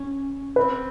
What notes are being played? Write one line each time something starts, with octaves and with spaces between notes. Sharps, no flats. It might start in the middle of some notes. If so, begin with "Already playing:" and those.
Already playing: C#4
C4 B4